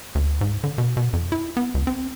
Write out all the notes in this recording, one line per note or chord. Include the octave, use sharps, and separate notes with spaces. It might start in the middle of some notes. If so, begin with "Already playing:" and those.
D2
G#2
D3
B2
B2
F2
E4
B3
C#2
C4